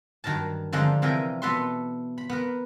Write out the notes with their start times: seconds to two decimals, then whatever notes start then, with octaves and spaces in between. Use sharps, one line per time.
0.24 G2 D#3 F#3 A#4 A5
0.72 D3 F3 G#3 D4 D#4
1.02 C3 E3 F3 A#4 G5 G#5
1.42 B2 B3 A4 B4 E5 C6
2.18 B5
2.29 B3 A#4 B4